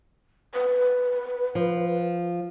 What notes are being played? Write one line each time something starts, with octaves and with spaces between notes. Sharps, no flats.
B4
F3